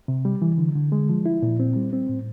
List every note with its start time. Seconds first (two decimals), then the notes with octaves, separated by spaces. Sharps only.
0.08 C3
0.25 G3
0.42 E3
0.58 D3
0.75 D3
0.92 G#3
1.09 F3
1.26 E4
1.42 A#2
1.60 C4
1.76 G3
1.93 C4
2.09 A2